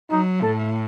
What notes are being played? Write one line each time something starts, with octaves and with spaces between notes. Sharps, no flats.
F#3 D#4
A2 A4